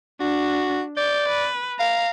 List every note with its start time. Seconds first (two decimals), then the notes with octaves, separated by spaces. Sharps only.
0.21 D4 F#4
0.97 D5 G6
1.29 B4
1.80 F5 A#5